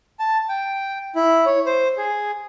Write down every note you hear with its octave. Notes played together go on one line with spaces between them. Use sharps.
A5
G5
E4
C#5
C5
G#4